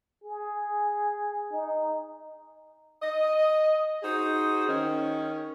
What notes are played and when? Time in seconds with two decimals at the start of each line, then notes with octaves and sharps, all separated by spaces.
0.24 G#4
1.52 D#4
3.01 D#5
4.03 D#4 F#4 G#4 C5
4.68 D#3 C#4